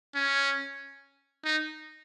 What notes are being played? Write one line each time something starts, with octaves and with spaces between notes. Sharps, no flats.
C#4
D#4